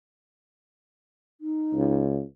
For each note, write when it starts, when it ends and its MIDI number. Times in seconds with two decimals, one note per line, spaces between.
1.41 2.01 63
1.74 2.21 37